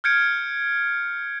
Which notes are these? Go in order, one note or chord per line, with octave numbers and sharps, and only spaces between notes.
F6 G6 G#6 C#7 D7